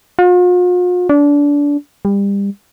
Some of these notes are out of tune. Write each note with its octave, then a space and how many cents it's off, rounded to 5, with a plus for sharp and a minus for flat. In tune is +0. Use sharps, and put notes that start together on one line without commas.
F4 +45
D4 -25
G3 +30